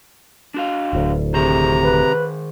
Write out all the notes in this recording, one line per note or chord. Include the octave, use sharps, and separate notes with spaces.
D4 F#4 F5
D1 D2
C3 D#3 G#4 C5 A#5
B4